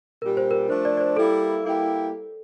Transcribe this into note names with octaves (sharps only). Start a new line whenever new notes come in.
A#2 G3 D4 G4 A#4
C5
A#4
F3 A3 D4 C5
D5
D5
C5
G3 A#3 E4 A4
G3 A#3 E4 G4